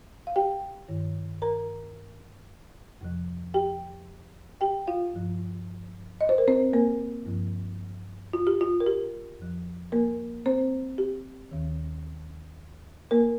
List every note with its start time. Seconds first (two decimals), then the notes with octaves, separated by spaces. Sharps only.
0.27 F5
0.36 G4 G5
0.89 G2 D#3
1.42 A#4 A#5
3.01 F2 C3 F3
3.54 G4 G5
4.61 G4 G5
4.87 F4 F5
5.14 G2 F3
6.21 D#5
6.29 C5
6.38 A#4
6.48 C4 C5
6.73 A#3 A#4
7.26 G2 F3
8.33 F4
8.47 G4
8.61 F4
8.80 A#4
8.86 G4
9.39 F2 F3
9.92 A#3 A#4
10.46 C4 C5
10.98 G4
11.51 D#2 D#3
13.11 A#3 A#4